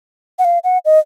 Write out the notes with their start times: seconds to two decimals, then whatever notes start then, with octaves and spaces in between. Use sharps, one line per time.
0.39 F#5
0.45 F5
0.64 F#5
0.85 D#5